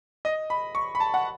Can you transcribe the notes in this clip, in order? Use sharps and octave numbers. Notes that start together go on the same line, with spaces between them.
D#5
B5
C#6
B5
A5
F#5